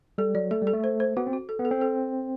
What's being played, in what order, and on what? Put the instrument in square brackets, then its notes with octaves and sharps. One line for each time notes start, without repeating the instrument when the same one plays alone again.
[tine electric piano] G3 [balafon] A4
[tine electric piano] F#3 [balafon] D5
[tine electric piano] A3 [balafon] A4
[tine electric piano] G3
[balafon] A4
[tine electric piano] A3
[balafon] C5
C5
[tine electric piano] B3 [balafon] F#4
[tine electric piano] C4
[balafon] F#4
A4
[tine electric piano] B3
[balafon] A4
[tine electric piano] C4
[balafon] A4